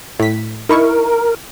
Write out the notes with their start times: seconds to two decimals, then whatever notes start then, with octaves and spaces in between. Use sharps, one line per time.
0.20 A2 B6
0.69 D#4 E4 A#4 C#6